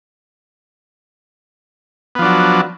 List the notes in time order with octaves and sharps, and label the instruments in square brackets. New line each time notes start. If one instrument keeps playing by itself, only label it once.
[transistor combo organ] B3
F3
D4
F#3